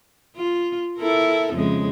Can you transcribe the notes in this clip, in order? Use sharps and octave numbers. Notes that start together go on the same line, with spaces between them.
F4
E4 A4 A#4
F2 C#3 G#3